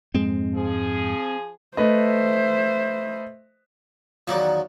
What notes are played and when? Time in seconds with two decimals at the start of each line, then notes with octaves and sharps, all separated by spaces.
0.14 F2 G#2 G#3 C4
0.54 F3 G#4
1.77 A3 B4 C5 D#5 E5
4.27 E2 D#3 F3 F#3 F#4 D5